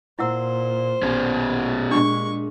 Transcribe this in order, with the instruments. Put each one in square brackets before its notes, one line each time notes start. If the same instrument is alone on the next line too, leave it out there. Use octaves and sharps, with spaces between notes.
[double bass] A#2 [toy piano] E4 F#5 E6 [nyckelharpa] C5
[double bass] A#1 [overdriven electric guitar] B2 C#4
[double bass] A#2 G#3 [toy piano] D4 G4 [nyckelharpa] C#6